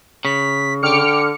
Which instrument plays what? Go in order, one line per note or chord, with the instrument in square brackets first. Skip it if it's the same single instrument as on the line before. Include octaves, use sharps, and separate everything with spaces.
[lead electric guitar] C#3 [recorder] B6
[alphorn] D3 [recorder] G5 [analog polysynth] D6 F6 C#7